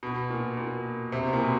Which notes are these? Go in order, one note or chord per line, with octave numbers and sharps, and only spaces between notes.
B2
A#2
A#2
C3
B2
A#2
B2